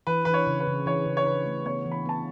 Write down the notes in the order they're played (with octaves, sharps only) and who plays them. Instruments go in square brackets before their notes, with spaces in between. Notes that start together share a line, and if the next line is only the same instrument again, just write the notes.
[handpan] E3 [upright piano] B4
[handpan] E3 [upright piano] B4
[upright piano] C#5
[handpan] C#3
[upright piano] B4
[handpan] C#3
[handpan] E3 [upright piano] C#5
[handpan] C#3
[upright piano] C#5
[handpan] C#3 [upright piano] B4
[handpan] A3
[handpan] B3 [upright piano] C#5
[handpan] E3
[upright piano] B5
[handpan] B3 [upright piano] A5